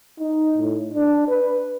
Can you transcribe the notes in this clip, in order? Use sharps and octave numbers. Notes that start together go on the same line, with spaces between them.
D#4
A2
D4
B4